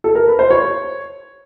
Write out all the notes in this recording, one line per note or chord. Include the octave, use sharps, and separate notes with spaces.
A4
A#4
B4
C5
C#5